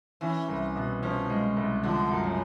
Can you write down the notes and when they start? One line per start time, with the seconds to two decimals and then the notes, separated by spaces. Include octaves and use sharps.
0.21 E3 C#4
0.48 C2
0.76 B2
1.03 F3 C#4
1.29 G#3
1.56 C2
1.83 D3 F3
2.10 F#2
2.23 C#3